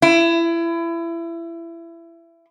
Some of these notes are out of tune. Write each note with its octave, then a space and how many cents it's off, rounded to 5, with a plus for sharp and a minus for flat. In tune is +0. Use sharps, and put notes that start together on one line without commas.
E4 +25